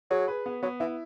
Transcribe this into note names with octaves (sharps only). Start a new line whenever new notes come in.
F#3 G#4
B4
B3
F#3 B3
E3 E4